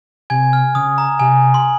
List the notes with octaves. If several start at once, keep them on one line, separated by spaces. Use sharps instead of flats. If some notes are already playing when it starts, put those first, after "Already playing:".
C3 G#5 G#6
F6
C#3 D#6
A#5
C3 G#5
C6